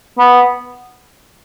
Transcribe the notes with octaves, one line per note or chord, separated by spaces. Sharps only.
B3